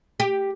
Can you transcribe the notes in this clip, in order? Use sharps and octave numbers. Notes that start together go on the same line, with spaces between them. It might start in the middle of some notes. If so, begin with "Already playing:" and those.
G4